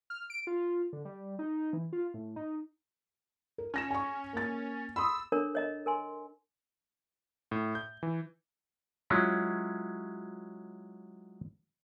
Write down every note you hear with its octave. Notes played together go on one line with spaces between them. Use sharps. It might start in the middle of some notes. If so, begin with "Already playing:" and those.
F6
D7
F4
D3
G3
D#4
E3
F4
A2
D#4
A#4
C#4 G#5 A#6 E7
G#5 C#6
A#3 A6
B5 C6 D#6 E6
D4 A4 A#4 C#5 A#5
C#5 D#5 A#5
A#4 G#5 C6
A2
G6
E3
F#3 G#3 C#4 E4 F4